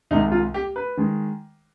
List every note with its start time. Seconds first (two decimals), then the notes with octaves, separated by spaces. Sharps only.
0.11 C2 C3 D#3 G#3 D#4
0.32 F4
0.54 G4
0.76 B4
0.97 D#3 G#3